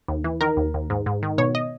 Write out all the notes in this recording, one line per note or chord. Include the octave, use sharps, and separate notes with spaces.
D#2
E3
D#3 A#4
D#2
D#2
G#2
G#2
D#3
B2 C#5
D#5